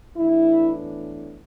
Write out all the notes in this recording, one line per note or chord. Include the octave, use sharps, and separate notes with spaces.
A2 E3 B3 D4 E4